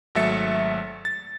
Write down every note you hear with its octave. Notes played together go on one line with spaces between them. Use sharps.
G#1 F#3 A3 E5 A6 C#7
A6